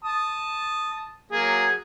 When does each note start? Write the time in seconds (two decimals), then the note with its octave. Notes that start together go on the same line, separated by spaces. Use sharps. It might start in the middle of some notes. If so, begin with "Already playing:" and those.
0.04 A5 D#6
1.32 F#3 A#3 G#4